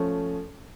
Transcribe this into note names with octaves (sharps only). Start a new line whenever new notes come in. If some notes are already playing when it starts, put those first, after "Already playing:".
Already playing: F3 A3 C#4